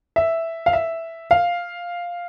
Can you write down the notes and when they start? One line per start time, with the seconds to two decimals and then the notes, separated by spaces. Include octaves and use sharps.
0.16 E5
0.66 F5
0.73 E5
1.31 F5